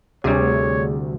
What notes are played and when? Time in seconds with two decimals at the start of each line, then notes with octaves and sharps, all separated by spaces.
0.24 D2 C3 G3 G#4 C#5